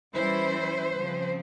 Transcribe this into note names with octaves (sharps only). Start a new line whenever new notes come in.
E3 G3 C#4 E4 C5
C#3 F3 C4